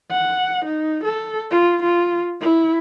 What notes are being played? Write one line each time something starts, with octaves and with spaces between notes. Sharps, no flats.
F#5
D#4
A4
F4
F4
E4